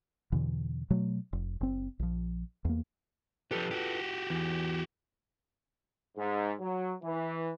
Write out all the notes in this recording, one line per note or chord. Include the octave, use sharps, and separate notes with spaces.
E2 B2 D3 E3
B2 F#3 A3
F1
F#1 C4
A#1 F3
E2 A#3
F3 F4 G4 A4 B4
F#4 G4
E2 E3
G#2
F#3
E3